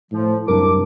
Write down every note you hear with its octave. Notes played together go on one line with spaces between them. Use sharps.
A2 F3
C2 F#2 D4 A#4 D6